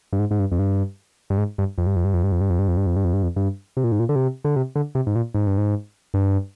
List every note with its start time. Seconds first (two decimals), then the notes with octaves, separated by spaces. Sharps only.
0.13 G2
0.19 G#2
0.31 G#2
0.39 G2
0.52 F2
0.59 G2
1.30 G2
1.38 G#2
1.58 G2
1.78 F2
1.87 G2
1.96 F2
2.05 G2
2.14 F2
2.24 G2
2.32 F2
2.41 G2
2.50 F2
2.59 G2
2.68 F2
2.77 G2
2.86 F2
2.96 G2
3.05 F2
3.13 G2
3.23 F2
3.36 G2
3.77 C3
3.84 A#2
3.92 G#2
4.00 A#2
4.09 D3
4.16 C3
4.45 D3
4.56 C3
4.76 D3
4.95 C3
5.07 G#2
5.16 A#2
5.34 G#2
5.47 G2
5.58 G#2
6.14 G2